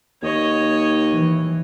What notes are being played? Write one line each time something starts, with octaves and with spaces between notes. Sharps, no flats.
D#2 C#5 D#5
E3